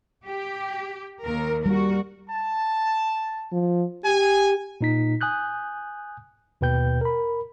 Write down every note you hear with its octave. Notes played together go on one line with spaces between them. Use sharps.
G4
D#2 A#4
G3 F#4 A#4
A5
F3
G4 G#5
A#2 D#4 B6
G#5 D#6 F#6 G6
D#2 B2 B4 G5 G6
A#4 B5